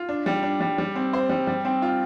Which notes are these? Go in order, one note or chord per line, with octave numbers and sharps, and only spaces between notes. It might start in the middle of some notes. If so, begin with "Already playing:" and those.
Already playing: F4
D4
G3
D4
G3
G3
C4
C5
G3
G3
C4
F4